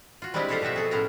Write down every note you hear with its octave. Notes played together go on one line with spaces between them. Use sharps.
F4 F#4
G3 G#3 C4 D4 E4 G4
F4 G4 A4 C5 C#5 E5
B2 F3 C4 F#4 E5
G#4 A4
A2 B3 C#4 A#4